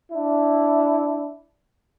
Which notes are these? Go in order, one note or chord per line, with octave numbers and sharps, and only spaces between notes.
D4 E4